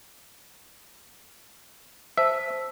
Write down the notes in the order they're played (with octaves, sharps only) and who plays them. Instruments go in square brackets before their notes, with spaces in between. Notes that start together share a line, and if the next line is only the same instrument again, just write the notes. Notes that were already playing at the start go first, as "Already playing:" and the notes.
[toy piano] C5 A5 [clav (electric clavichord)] E5